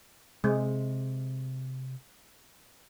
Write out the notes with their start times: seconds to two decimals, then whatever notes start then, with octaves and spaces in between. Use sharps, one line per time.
0.44 C3 G#3